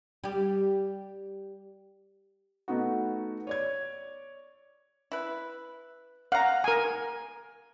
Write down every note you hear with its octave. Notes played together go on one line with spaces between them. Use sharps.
G3 G4
A3 B3 D#4 F#4
C#5 D5 G#6
E4 B4
F5 F#5 A#5
A#4 G#5